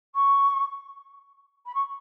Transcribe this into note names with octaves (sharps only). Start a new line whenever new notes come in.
C#6
B5
C#6